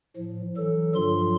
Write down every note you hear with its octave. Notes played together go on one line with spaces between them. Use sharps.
A2 F3
E3 F#3 A4
G2 D3 F3 F#3 F4 C6